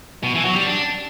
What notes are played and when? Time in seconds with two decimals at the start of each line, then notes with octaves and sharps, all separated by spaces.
0.23 B2
0.34 E3
0.45 F#3
0.56 G3
0.67 D4